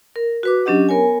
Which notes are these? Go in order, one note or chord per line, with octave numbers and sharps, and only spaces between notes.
A#4
F#4 B4 D6
F#3 C#4 D4 G4 D#5 F#5
B3 A#4 C#5 G#5